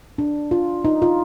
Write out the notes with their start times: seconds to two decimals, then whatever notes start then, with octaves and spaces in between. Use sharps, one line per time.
0.18 D4
0.51 F4
0.85 D#4
1.02 F4